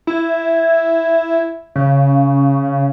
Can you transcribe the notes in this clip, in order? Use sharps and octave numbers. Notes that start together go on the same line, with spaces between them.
E4
C#3